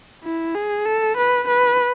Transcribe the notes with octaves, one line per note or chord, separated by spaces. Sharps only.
E4
G#4
A4
B4
B4